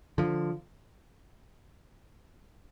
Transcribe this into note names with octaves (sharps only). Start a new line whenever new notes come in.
D3 F3